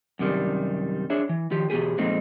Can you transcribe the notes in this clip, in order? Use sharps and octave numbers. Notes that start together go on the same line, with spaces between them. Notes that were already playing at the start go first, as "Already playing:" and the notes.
F#2 C3 D#3 G3
D4 G#4 C#5 E5
E3
D#3 F3 G4
E2 B2 F3 G4 G#4
F2 A#2 G#3 A3 C4 D#4